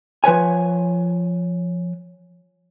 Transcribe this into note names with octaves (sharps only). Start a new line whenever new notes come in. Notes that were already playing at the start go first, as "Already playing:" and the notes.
F3 B4 C#5 G#5